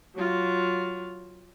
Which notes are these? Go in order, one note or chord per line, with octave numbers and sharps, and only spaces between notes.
F#3 F4